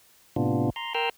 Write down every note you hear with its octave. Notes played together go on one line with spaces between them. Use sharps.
A2 C3 B3 D4 F4
A#5 C6
A#4 G5 A#5 C6 E6 F6